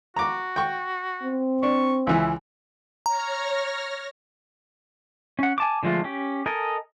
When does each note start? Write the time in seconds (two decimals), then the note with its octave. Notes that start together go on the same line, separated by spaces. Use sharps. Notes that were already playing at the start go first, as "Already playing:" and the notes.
0.16 F#4 A#5 D6
0.56 G5 C#6
1.23 C4
1.63 D4 C#6
2.07 C#2 E3 E5
3.06 C#5 A#5 F6 A#6
5.39 C#4 F#5
5.58 G#5 A5 D6
5.83 D3 F3 G#3 A3 F4
6.04 C#4 G4
6.46 A4 A#4 D#5 G#5